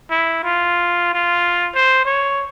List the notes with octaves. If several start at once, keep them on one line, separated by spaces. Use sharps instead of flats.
E4
F4
F4
C5
C#5